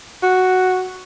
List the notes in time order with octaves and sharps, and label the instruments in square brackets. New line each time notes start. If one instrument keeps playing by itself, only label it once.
[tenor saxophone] F#4